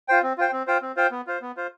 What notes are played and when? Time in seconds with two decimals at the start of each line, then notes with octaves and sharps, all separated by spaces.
0.08 F4 C5 G5
0.23 C4
0.38 F4 C5 G5
0.53 C4
0.67 F4 C5 G5
0.82 C4
0.97 F4 C5 G5
1.11 B3
1.27 F4 C5
1.42 B3
1.57 F4 C5